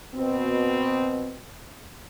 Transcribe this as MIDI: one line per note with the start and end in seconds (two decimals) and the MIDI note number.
0.15 1.36 47
0.15 1.36 60